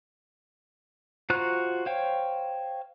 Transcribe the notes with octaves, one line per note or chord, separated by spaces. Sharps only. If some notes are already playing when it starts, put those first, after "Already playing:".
F4 F#4 C5 A#5 F#6
C5 C#5 F5 G5